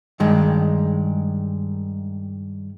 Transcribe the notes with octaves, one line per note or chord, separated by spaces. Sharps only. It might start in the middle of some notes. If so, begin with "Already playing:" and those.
G2 D#3 G#3